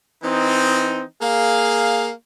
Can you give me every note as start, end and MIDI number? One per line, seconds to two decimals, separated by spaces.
0.23 1.04 52
0.23 1.04 60
0.23 1.04 63
1.21 2.10 58
1.21 2.10 68
1.21 2.10 77